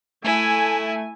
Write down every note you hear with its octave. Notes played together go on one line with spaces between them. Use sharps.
A3 E4 G#5